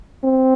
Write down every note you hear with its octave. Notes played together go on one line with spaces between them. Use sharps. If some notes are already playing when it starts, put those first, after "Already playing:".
C4